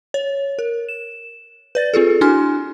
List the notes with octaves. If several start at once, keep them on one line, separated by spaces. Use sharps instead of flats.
C#5
A#4
E7
B4 D5 A6
C4 F4 G#4 A4
D4 E4 F#4 G#5 C6 F6